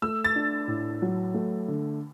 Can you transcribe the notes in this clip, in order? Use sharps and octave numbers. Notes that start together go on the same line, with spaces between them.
A3 E6
A6
D4
A2
F#3
A3
D3